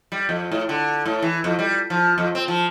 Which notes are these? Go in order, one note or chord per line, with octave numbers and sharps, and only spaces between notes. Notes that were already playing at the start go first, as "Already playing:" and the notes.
G3
F2
A2
D3
A2
E3
F2
G3
F3
F2
C4
F3